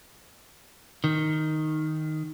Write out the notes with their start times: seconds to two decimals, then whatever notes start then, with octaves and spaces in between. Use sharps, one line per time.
1.04 D#3